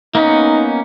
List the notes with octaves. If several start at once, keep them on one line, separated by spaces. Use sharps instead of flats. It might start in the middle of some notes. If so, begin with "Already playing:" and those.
A#3 B3 C#4 D#4